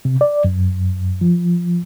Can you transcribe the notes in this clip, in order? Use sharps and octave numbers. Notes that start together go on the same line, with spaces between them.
C3
D5
F#2
F3